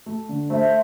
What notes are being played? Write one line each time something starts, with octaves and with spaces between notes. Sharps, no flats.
A3
D3
A3 C5 E5